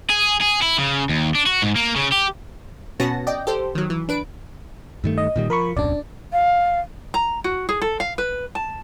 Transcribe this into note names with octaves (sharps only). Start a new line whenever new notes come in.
G#4
G#4
E4
C#3
D#2
D4
F#4
G#2
A#3
C#3
G4
B2 B3 C#4 F#4 A5 A#6
D5 D#5 G5
G4 A4 C5
D#3 F#3
E3
D4 B4 D7
G2 D#3 A3
D#5
A#2 D#3 G3
F3 A#4 B5 C#6
D1 B1 F#2 D4 D5
F5
A#5
F#4
G#4
A4
F5
B4
A5